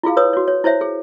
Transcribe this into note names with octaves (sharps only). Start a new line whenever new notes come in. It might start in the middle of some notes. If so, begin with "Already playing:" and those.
E4 F4 G#4 F5
B4 C#5 D#6
F#4 C#5
C#5
E4 C5 C#5 E5
G#4